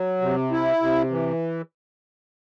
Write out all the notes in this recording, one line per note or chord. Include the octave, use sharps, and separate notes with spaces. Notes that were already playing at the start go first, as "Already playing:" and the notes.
Already playing: F#3
C3
E4
C3
E3